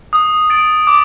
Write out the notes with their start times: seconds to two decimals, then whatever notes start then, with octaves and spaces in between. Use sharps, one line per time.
0.13 D#6
0.50 A6 D7 F#7
0.87 D6